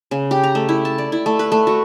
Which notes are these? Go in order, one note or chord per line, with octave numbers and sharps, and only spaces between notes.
C#3
G4
A#5
A3
E4
A5
D5
E4
A3
B4
A3
F#4